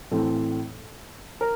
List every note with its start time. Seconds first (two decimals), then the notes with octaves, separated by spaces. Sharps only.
0.11 A2 E3 A3 C4 A4
1.41 A#4